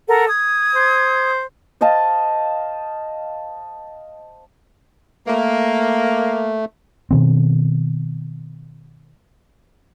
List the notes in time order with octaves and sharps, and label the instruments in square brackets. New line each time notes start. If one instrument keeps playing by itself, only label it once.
[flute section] A4 A#4 F#5
D#6 G#6
[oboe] C5
[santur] C5 D#5 F5 A5
[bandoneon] A3 [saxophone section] A#3
[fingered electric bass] B2 D#3 C4